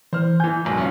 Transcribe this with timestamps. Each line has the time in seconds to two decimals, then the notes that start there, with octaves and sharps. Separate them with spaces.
0.13 E3 C5 F6
0.40 E3 G#5 G6
0.65 F#1 B1 G#2
0.77 C#4 F4